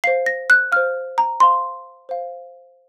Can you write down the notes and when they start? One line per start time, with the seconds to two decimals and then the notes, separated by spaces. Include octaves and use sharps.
0.04 C5 F5 C7
0.26 A#6
0.50 F#6
0.72 C5 F5 F6
1.18 A#5
1.40 C5 F5 C6
2.09 C5 F5